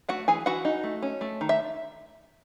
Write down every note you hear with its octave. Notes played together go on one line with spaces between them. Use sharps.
A3 F#4 F#5
E3 G#4 G#5
E3 F#4 F#5
D#4
A3
C#4
A3
D#3
E5